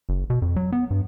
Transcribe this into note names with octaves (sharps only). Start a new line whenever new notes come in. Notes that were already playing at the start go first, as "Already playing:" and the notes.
F#1
B2
F2
F#3
B3
G2